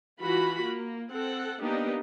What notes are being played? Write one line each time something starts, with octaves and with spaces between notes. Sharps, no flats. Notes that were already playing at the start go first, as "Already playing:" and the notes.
E3 F4 F#4 B5
A#3
C4 A4 F#5
A#3 B3 D4 D#4 G4